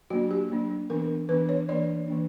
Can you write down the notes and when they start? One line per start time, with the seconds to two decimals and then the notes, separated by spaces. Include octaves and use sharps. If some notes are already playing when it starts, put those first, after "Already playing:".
0.10 F#3 A#3 D4 F#4
0.31 G4
0.50 F#3 A#3 D4
0.90 E3 B3 D4 A#4
1.29 E3 B3 D4 B4
1.49 C#5
1.69 E3 A#3 D4 D5
2.08 E3 A#3 D4